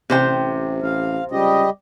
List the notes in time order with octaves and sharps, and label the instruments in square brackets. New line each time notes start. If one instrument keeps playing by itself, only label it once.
[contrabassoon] A1 [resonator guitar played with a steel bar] C3 C5 G5
[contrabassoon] A1 [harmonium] F5
[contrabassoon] C#2 [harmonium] G3 G4 D#5